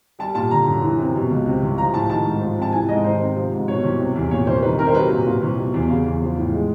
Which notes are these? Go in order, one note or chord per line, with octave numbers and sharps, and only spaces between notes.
G3 A5
A#2 A5
D3 A#5
F#2
E3
C3
B2
C#2
C3
C2
F3 A#5
A2 A5
D#3 A5
G#2
F3
C3
A5
E3 G#5
G#2 D#5
D#3 C5
C3
F3
G#2
B2 C#5
C2
C3
E2
A#2 C#5
C2 C5
D#3 B4
C3 A#4
C5
F#3 B4
A#2
A#2
C2
B2
E2
C#3
E2
F3
A2
G#3